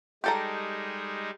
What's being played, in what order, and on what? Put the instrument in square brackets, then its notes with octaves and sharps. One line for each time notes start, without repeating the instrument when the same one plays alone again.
[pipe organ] G3 G#3 D#4 [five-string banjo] G4 A4 A#5